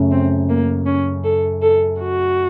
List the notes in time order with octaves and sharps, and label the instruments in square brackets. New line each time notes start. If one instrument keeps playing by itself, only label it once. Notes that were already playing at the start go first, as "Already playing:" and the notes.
Already playing: [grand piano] F#2 C#3 A3
[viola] C4
A#3
C#4
A4
A4
F#4